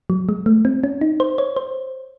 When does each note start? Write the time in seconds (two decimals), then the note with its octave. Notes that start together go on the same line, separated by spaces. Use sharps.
0.10 F#3
0.29 G#3
0.46 A3
0.65 C4
0.84 C#4
1.01 D#4
1.20 C5
1.38 C#5
1.56 C5